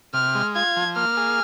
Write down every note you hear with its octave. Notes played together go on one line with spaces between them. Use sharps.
C3 F6
G#3
F4 G#6
F3
A#3 F6
G#4